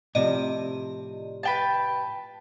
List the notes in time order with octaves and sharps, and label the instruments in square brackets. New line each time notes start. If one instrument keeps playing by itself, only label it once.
[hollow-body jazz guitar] A2 C3 F3 [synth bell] D5 D#5
[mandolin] B4 G5 A5